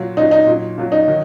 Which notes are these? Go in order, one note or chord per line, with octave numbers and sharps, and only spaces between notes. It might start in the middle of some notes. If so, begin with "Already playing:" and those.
Already playing: A#2 F#3
A#2 F#3 D#4
D#4
A#2 F#3
A#2 F#3
D#4
D#3 F#3